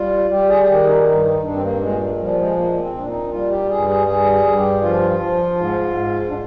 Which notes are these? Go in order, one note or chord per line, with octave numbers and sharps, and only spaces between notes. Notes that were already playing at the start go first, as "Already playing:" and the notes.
Already playing: G3 F4
G3 G4
G#4
G#4
D#3 G4
D#4
G2 D#4
D#4
G2 D4
C4
A#3
A#2 G#3
F3 G3
G#3
A#2 A#3
A#3
C4
A#2 D4
D#4
G3 F4
G4
G2 G#4
G#4
G3 G#4
G#4
G2
G4
F3 F4
F3
G#2
G#2
D4